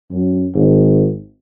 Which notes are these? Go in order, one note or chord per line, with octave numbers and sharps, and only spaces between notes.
F#2
G#1